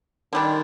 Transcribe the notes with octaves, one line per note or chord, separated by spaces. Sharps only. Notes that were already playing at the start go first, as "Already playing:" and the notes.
D3 D#3 G3 D4